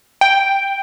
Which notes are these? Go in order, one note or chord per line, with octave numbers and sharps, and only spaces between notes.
G5